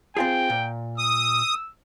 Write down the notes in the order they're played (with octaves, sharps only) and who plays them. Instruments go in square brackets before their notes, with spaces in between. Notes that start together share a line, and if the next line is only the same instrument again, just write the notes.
[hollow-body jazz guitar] C4 F4 G#4 [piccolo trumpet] G5
[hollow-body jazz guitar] A#2
[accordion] D#6 [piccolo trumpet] E6